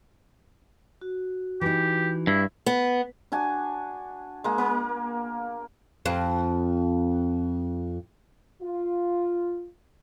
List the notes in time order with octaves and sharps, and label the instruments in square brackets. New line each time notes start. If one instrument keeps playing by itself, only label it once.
[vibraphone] F#4
[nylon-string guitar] E3 D#4 [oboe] G4
[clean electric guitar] G2 [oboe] E4
[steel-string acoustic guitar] B3
[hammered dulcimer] D4 F#4 G#5
G#3 A#3
A#3
[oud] F2 C4
[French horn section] F4